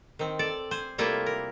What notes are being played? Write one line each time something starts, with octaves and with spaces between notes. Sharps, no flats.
D#3 C4
A4 D5
C5 G#5
C3 G3 A3 A#3 E4 F4
A#4